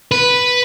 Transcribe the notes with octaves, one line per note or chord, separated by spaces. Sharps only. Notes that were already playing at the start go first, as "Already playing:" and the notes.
B4